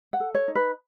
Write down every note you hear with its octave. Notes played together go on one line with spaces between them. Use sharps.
F#5
A4
C#5
D#4
B4